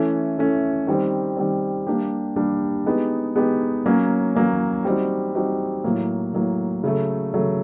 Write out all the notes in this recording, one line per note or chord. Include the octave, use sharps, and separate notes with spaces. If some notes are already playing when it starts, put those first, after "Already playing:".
Already playing: E3 A3 C#4
E3 A3 C#4
D#3 G3 C4
D#3 G3 C4
G3 A#3 D4 G4
G3 A#3 D4 G4
G#3 B3 D#4 G4
G#3 B3 D#4 G4
F#3 A#3 C#4
F#3 A#3 C#4
G3 C4 D#4 F#4
G3 C4 D#4 F#4
A2 F#3 A#3
A2 F#3 A#3
C#3 F#3 A3
C#3 F#3 A3